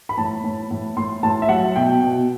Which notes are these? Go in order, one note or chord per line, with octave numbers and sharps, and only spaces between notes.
B5
A2 A5
A2
A2
A2 C6
A2 A5
E5
F#3 F#5
B2 G5
B2